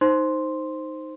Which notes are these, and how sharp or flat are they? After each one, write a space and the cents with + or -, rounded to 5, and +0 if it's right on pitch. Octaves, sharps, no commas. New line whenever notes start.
D#4 +0 C5 +0 C6 +0